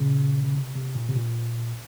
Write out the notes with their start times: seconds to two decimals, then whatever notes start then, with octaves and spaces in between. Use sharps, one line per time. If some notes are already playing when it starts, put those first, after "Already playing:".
Already playing: A#2 C#3
0.43 C#3
0.55 C3
0.76 C3
0.95 A#2
1.09 C3
1.16 A#2